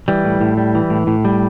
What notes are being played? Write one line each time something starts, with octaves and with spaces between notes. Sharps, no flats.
E3 G3
A2
A2
G3
E3
A2
A2
G3